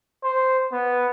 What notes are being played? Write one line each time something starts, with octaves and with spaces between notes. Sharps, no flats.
C5
B3